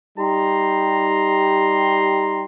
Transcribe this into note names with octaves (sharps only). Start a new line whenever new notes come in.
G3 D#4 G4 A#5 C6